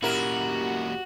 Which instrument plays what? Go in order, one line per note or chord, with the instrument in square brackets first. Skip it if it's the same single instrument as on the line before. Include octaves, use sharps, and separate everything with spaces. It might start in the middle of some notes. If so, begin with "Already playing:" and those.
[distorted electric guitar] A#2 C#4 [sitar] E4 A#4 [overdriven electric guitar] F#4 [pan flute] G4